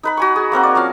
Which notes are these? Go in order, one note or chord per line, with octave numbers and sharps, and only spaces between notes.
D#4 B4 B5
F#4 G#5 C#6
G#4
A#3 C4 A#4 F#5
D5
F3 C#4 F5